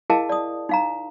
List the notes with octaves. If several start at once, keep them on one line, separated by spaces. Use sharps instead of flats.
E4 G#4 A#4 D#5 F5 A5
D5 D#6
D#4 F5 A#5